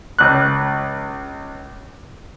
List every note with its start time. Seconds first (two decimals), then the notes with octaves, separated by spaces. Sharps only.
0.19 C#2 F#6